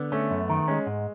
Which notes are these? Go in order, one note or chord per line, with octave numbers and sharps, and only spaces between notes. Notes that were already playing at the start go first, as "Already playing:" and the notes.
Already playing: D3 B3
A3 C#4
F#2
D#3
G#3 C#4
G#2